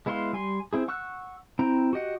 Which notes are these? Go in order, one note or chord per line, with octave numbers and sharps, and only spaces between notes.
G#3 B3 E4 F5 C6
G3 G#5 C6
C4 E4 G#4
F#5 C#6 E6 F#6
C4 E4 G5 A#5
F#4 G4 D#5 F#5